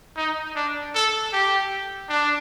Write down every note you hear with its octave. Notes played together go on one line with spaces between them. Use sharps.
D#4
D4
A4
G4
D4